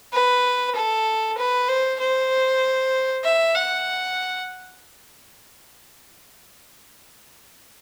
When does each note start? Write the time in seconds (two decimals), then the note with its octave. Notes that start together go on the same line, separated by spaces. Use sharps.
0.13 B4
0.75 A4
1.38 B4
1.68 C5
2.00 C5
3.24 E5
3.55 F#5